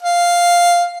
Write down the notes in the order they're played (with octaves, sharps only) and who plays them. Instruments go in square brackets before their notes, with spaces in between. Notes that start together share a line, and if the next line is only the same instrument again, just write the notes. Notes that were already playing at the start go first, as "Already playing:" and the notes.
[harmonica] F5